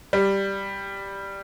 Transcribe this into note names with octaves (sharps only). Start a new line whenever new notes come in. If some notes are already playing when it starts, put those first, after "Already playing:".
G3